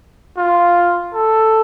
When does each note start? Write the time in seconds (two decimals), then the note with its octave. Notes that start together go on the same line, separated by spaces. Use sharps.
0.37 F4
1.14 A4